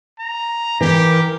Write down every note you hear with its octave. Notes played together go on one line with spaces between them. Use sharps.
A#5
E3 G4 A#4